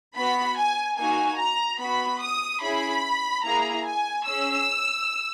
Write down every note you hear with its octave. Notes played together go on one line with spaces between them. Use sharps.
B3 F#4 B5
G#5
A#3 D#4 F#4 G#5
A#5
B3 F#4 B5
D#6
C#4 E4 G#4 B5
A#3 E4 G#4 A#5
G#5
C#4 G#4 E6